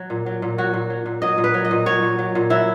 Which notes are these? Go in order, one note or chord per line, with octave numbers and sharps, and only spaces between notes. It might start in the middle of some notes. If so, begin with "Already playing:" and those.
Already playing: F#3
A#2
F#3
A#2
F#3 F#4
A#2
F#3
A#2
F#3 D#5
A#2
B4
F#3
D#5
A#2
F#3 C#5
A#2
F#3
A#2
F#3 E4